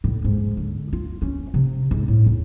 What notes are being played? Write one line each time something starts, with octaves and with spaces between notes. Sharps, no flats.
A2
G#2
D3
F4
C#4
C3
G#2
A2
E2